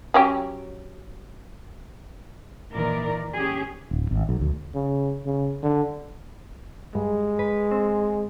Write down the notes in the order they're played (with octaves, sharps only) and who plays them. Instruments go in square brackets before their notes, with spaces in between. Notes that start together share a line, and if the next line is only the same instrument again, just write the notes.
[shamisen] F#3 C#4 G4
[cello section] A#2 D#3 E3 A#4 D5
C#4 G4 G#4
[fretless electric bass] D1
G#1
B1
D2
[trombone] C#3
C#3
D3
[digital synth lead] G2 [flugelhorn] G#3
[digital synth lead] B4
C4